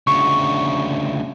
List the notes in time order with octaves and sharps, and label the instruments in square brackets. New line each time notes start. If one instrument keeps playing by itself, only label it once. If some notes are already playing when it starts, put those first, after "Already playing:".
[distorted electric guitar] D2 C#3 [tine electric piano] C#6